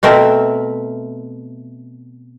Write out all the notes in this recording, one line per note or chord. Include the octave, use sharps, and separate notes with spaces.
B2 A3 C4 A#4 E5